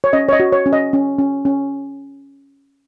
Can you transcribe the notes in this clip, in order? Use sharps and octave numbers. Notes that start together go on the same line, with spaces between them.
C#5
C#4 D#5
C#5
D#5
F#4
C#5
C#4
D#5
C#4
C#4
C#4